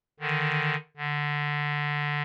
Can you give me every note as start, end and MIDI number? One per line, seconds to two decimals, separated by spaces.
0.20 0.76 50
0.20 0.76 51
0.97 2.22 50